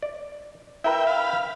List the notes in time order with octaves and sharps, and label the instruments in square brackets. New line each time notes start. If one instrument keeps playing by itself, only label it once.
[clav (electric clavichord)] D5
[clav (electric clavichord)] E4 A#4 B4 [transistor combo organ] E5 G5
[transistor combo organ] F5 B5